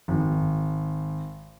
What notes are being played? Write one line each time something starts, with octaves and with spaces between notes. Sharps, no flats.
G#1